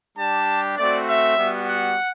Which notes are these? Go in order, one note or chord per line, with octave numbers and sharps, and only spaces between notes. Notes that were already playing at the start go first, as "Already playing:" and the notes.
G3 D4 G4 A5
A3 C4 F#4 D5
E5
G3 B3 F#4
F#5